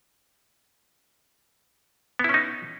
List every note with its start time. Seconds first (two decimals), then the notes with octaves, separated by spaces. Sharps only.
2.19 B3
2.24 E4
2.29 C#4
2.34 D#4